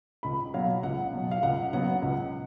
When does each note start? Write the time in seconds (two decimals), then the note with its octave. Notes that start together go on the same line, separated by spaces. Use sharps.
0.23 C#2 B5
0.54 B2 F#3 F5
0.83 C#2 F#5
1.13 B2 F#3
1.31 F5
1.43 C#2 F#5
1.73 C#3 F#3 B3 F#5
2.02 C#2